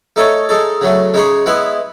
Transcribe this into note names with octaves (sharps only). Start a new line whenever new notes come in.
A3 D#4 A4 C#5
G#3 D#4 A4
C#3 F#3 A3
C#3 G#3 D#4 G#4 C#5
G#3 B3 E4 B4